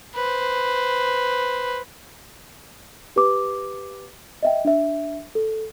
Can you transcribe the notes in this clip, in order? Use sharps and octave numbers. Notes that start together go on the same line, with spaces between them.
B4 C5
G4 B4 D6
D#5 E5 G5
D4 E5
A4